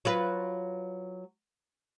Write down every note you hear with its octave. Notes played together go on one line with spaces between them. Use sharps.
F#3 F4 B4